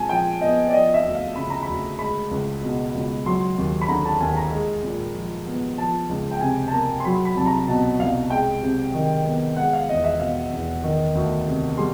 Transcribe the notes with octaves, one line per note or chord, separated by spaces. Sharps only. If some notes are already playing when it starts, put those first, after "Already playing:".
Already playing: A#2 G#3 G#5 A5
F3 G5
B3 D#5
D5
F3 D#5
E5
D2
F5
C#3 B5
A#5
B5
D2
G#3 B5
C#2
B2
C#2
F#3 C6
D#2
B5
D3 A#5
A5
D#2 G#5
A#5
G#3
A#2
F3
B3
F3 A5
C#2
G5
C3 G#5
A5
A#3 A#5
C6
F#3 B5
B5
C2 A5
A#5
B2 A5
C2 F5
G#3 G5
C3
D#3
B3
G#3 F#5
F5
E2 D#5
E5
B2 F5
E2
D#3
D2
C3
G3 C6